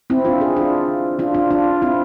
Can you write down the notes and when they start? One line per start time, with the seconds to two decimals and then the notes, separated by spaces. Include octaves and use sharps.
0.10 C4 E4
0.25 D4 F4
0.41 E4 G#4
0.56 D4 F4
1.19 D4 F4
1.34 D4 F4
1.51 D4 F4
1.82 C4 E4